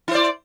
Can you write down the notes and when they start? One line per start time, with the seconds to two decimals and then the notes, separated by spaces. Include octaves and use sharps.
0.08 E4
0.11 C5
0.15 D5